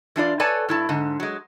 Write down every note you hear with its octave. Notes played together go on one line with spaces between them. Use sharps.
E3 D4 F4 D5
A4 B4 C#5 D5 G#5 A5
G2 E4 A5
G#2 D3
F#3 G#3